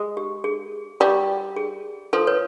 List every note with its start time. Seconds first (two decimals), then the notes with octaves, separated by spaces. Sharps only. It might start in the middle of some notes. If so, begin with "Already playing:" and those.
Already playing: G#3
0.17 G4
0.44 G#4
1.00 G3 G4
1.56 G#4
2.13 F3 A4
2.27 B4 C#5